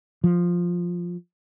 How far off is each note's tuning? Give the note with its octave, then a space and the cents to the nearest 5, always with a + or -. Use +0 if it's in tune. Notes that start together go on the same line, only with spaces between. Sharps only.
F3 +5